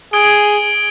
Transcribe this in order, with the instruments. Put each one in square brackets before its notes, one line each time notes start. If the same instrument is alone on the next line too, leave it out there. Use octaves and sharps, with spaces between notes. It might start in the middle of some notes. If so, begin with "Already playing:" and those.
[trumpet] G#4 [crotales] D#6 G#6 D7 G7